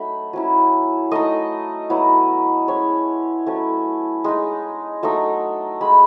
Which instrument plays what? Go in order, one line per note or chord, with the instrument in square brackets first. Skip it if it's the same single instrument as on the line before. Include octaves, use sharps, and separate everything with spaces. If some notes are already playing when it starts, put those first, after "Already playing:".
Already playing: [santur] F#3 A3 D#4 B5
F#3 C#4 E4
A3 D#4 D#5
F#3 B3 E4
G#3 C#4 E4 C#5
F#3 A3 C#4 E4
G#3 D#4
F#3 A3 D#4
G#3 D#4 B5